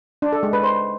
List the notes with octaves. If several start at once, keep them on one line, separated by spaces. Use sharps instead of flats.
D4
A4
G#3
B4
C5